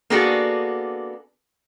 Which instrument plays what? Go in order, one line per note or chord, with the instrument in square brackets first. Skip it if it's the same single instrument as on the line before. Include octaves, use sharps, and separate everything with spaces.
[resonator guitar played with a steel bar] A#3 B3 D4 F#4 G#4 A4